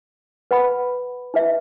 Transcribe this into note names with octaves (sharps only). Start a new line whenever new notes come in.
B4 F#5 B5
E4 B4 E5